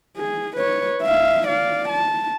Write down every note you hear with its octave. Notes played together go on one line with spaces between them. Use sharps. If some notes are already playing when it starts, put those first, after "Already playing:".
G#4
B4 C#5
E5 F5
D5 F5
A5